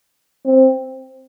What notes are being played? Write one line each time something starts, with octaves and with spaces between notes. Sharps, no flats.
C4